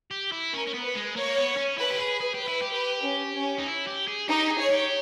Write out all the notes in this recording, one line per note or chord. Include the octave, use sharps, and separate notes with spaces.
G4
E4
C#4 A#4
C#4
B3
B4
G#3
A#3 C#5
B3
C#4
E4 B4
G4
G#4
G#4
G4
B4
E4
G4
B4
C#4
C#4
D#4
E4
G4
G#4
D#4 G4
G#4
C#5
G4